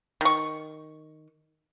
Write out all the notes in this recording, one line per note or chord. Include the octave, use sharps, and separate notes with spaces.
D#3 C#6